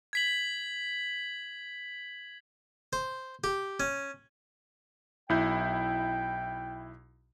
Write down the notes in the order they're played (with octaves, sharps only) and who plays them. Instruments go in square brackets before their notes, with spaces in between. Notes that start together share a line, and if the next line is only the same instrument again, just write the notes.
[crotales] G#6 B6 F#7
[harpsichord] C5
G4
C#4
[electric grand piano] B1 E4 G6 [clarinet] G5